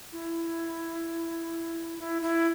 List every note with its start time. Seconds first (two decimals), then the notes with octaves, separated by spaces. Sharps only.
0.12 E4
1.99 E4
2.22 E4